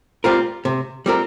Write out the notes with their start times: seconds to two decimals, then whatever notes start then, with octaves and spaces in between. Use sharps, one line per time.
0.24 G3 C4 F4 A#4
0.65 C3
1.06 G3 C4 F4 A#4